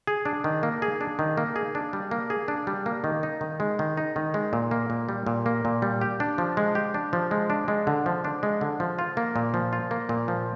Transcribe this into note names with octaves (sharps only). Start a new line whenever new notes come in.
G#4
D4
D#3
A#3
G#4
D4
D#3
A#3
G#4
D4
G3
A#3
G#4
D4
G3
A#3
D#3
D#4
D#3
G#3
D#3
D#4
D#3
G#3
A#2
A#3
A#2
G3
A#2
A#3
A#2
G3
G4
D4
F3
G#3
G4
D4
F3
G#3
D4
G#3
D3
F3
D4
G#3
D3
F3
F4
A#3
A#2
F3
F4
A#3
A#2
F3